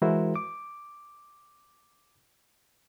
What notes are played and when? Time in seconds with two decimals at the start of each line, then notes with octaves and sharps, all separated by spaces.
0.02 E3 G#3 E4 F#4 A#4 C5
0.36 D6